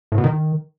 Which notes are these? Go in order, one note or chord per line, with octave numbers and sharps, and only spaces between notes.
A2
B2
D#3